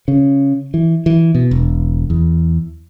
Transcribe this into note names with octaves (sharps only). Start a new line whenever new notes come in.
C#3
E3
E3
B2
E1
E2